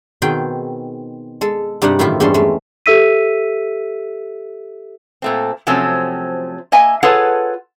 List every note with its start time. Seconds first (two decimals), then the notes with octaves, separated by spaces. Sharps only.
0.22 B2 D#3 C4 G#4 G5
1.41 G#3 A4
1.82 G2 C3 G3 D#4 F#5
1.99 F#2 A2 D#3 E3 E4 F4
2.20 E2 G2 C4 C#4 A4 C6
2.34 G#3 A3
2.86 G4 A4 E5 E6 B6 D#7
5.22 A#2 A3 C4
5.67 C3 F3 F#3 A3 C4 C#4
6.72 A#3 D#5 E5 G#5
7.03 F4 G#4 A4 B4 C#5 F#5